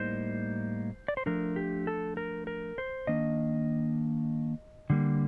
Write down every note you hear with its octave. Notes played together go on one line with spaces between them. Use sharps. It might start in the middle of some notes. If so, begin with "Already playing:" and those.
Already playing: A2 G3 A#3 D#4 C5
D5
C5
F3 A3 D4 A#4
G4
A4
A#4
A#4
C5
D#3 A#3 D4 D#5
D3 G3 A#3